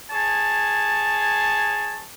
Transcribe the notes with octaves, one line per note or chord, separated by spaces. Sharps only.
G#4 C#5 A5